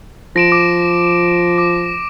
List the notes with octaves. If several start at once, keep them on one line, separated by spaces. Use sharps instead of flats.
F3 A#6 D7 E7
D6
D6